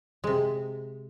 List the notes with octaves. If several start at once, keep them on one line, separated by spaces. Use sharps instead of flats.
C3 G#3